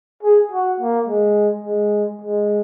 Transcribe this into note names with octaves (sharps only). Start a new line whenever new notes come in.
G#4
F#4
A#3
G#3
G#3
G#3